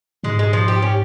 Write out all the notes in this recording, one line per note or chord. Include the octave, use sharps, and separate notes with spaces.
G#2 G#3
G#3
F3
G4
C#4